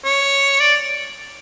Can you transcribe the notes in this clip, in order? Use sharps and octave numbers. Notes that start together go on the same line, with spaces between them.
C#5
D5